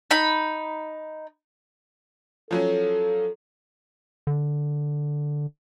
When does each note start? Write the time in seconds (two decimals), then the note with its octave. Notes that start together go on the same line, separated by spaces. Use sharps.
0.11 D#4 B5
2.51 F3 F#3 C#4 A4
4.27 D3